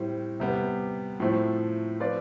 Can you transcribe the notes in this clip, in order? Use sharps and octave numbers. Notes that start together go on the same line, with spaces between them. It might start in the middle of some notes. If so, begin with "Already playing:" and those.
Already playing: A2 G3 C4
C3 G3 B3
A2 F3 A3 C4
F3 C4 F4 B4 D5